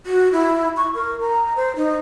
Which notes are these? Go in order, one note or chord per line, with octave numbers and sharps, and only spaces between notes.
F#4
E4
C#6
A#4
A#5
C5
D#4